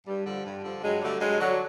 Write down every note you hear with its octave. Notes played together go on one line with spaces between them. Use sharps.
G2 G3
D3 F3 G3
G2
D3 F3
G2 F#3 G#3
D3 F#3 G3 A3
G2 F#3 G#3
D3 F#3